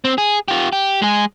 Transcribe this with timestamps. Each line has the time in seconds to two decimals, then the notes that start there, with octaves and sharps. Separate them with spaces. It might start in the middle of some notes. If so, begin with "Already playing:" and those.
0.05 C4
0.18 G#4
0.48 F4 G4
0.73 G4
1.02 G#3 G#4